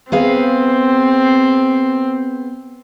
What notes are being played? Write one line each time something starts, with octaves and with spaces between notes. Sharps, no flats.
B3 C4 G#4 F5